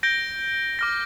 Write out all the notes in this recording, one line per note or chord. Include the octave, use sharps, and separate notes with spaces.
G6 A#6 D7 G7
D6 F6 A#6